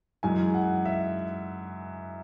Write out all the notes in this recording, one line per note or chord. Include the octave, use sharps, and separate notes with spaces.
F#2 E3 G#3 G#5
F#5
E5